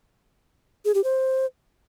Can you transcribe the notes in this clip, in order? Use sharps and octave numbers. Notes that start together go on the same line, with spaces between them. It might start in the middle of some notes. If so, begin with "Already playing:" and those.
G#4
G4
C5